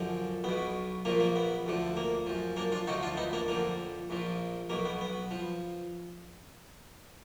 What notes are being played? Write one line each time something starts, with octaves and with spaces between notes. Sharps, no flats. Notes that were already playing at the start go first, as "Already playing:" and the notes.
Already playing: F#2 D3 F3
B1 B2 B3
A#1 A#2 F3 A#3
A#3
B3
D2 D3 F3
A#3
F#2 F3
A#3 D4
D4 F4
D2 D3 F3 D#4 F#4
D4 F4
B3 D#4
A#3 D4
F2 D3 F3 A#3
A#1 A#2 F3
B1 B2 A#3
B3
B3
F3